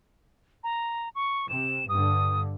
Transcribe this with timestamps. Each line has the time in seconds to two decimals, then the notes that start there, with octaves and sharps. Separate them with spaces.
0.63 A#5
1.15 C#6
1.49 C3 E7
1.89 G2 D3 D#6